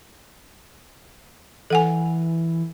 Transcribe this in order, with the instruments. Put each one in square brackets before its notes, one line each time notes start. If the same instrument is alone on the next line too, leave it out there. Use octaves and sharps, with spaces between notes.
[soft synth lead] E3 [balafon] A4 F#5 G#5